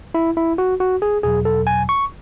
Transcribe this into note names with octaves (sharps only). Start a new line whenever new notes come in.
E4
E4
F#4
F#4
G#4
E2 B2 F#3 G#4
A4
G#5
C#6